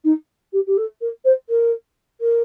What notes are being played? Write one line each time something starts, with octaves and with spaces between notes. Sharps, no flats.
D#4
G4
G4
A4
A#4
C5
A#4
A#4